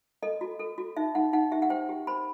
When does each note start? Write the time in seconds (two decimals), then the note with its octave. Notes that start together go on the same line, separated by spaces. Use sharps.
0.23 A4 D#5
0.41 F#4
0.59 A4
0.78 F#4
0.97 D#4 E5
1.15 D#4 F#5
1.33 D#4 F#5
1.52 G4 E5
1.62 F#5
1.70 C5 G5
1.89 G4
2.07 C5 B5